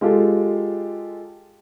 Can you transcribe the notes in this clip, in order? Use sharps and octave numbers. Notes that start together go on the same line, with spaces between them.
G#3 F4 G4 A4